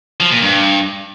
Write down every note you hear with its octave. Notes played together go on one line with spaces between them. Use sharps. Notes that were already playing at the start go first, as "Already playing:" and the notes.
F3
A#2
G2